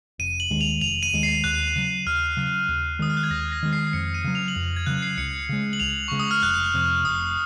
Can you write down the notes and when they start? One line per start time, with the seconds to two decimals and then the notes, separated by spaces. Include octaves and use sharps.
0.19 F1 D#7
0.40 F#7
0.50 D#2 D#3 G#3
0.61 F7
0.81 F1 F7
1.03 D#7
1.13 D#2 D#3 G#3
1.23 C7
1.44 D#2 F#6
1.76 C#3 F#3
2.06 D#2 F6
2.37 C#3 F#3
2.69 D#2
2.99 D#3 G#3 D#6
3.10 F6
3.17 F#6
3.23 G#6
3.31 D#2 A#6
3.52 A#6
3.63 D#3 G#3
3.73 C7
3.87 C7
3.93 F2 C#7
4.14 D#7
4.24 C#3 F#3
4.35 F7
4.48 F#7
4.56 F2 F7
4.76 G#6
4.86 C#3 F#3 F#6
5.02 C7
5.17 C#2 C#7
5.49 C#3 G#3
5.73 F#7
5.80 C#2 F7
6.08 C#3 G#3 C#6
6.20 D#6
6.31 F6
6.42 F1 F#6
6.74 F2 C3
7.05 F1 D#6